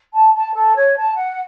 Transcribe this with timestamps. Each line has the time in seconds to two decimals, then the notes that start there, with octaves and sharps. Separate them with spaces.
0.13 A5
0.33 A5
0.53 A4
0.74 C#5
0.95 A5
1.15 F#5